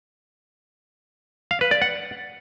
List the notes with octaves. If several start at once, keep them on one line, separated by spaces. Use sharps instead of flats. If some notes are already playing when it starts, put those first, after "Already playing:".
F5
B4
D5
F#5